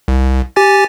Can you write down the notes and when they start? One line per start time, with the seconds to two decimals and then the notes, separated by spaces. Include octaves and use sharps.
0.08 C2
0.56 G4 G#5 A6